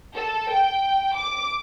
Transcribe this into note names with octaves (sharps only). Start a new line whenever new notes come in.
A4
G5
D6